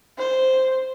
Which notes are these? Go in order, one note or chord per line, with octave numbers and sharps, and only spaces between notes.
C5